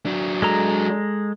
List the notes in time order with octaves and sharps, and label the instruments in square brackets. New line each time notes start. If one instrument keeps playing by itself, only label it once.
[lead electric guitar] F#3 D4
[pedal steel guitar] G#3 A4 A#5